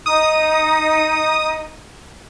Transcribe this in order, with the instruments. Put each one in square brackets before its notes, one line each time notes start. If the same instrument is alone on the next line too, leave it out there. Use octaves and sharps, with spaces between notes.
[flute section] D#4 [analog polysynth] D#6